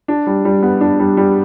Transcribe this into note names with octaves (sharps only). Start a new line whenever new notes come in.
D4
G3
G3
B3
D4
G3
G3